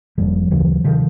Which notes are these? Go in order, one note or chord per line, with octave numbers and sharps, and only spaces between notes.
F#1 F2 D3 F3 G3
D2 C#3 E3 F#3
C3 D#3 F3